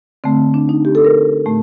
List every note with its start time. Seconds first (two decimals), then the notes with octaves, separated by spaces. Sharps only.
0.24 D3 A3 C4
0.54 D4
0.69 D#4
0.85 G4
0.95 A4
1.05 A#4
1.46 A2 A3